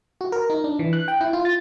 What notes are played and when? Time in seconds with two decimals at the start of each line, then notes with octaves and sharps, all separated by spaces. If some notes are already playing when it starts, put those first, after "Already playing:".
0.21 F#4
0.32 A#4
0.50 D#4
0.64 D4
0.79 E3
0.93 F#6
1.08 G5
1.21 E4
1.33 F4
1.45 A6